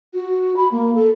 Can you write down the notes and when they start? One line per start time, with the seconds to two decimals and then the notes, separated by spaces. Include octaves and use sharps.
0.14 F#4
0.57 B5
0.72 A#3
0.95 A4